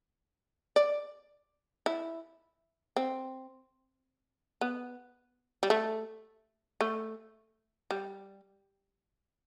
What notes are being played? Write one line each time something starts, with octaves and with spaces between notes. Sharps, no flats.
D5
E4
C4
B3
G3
A3
A3
G3